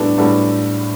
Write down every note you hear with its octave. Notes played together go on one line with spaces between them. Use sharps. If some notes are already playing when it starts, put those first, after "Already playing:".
Already playing: A2 G3 B3 D4 A4
A2 G3 B3 D4 A4